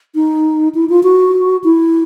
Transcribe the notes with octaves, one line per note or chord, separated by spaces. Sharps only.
D#4
E4
F4
F#4
E4